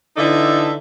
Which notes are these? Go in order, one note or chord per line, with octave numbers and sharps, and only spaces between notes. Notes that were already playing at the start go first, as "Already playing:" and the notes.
D3 E3 D#4 A4 D5 E5